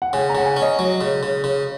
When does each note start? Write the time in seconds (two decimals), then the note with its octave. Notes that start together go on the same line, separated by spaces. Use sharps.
0.02 F#5
0.13 C#3 G#5
0.30 A#5
0.35 C#3 F#5
0.46 G#5
0.56 C#4
0.62 D#5
0.79 F#3
1.01 C#3
1.23 C#3
1.44 C#3